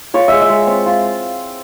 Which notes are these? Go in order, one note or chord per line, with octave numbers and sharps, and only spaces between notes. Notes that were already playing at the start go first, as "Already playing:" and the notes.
F4 C#5
G#3 E5
E5
G#3
C4
F4